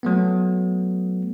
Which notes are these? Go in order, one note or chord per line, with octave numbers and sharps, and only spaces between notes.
F#3 A3 B3